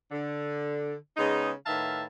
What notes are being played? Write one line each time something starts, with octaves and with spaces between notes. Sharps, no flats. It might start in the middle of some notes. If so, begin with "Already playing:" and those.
D3
C#3 G#3 B3 D#4
A2 D#3 B4 E5 F5 A5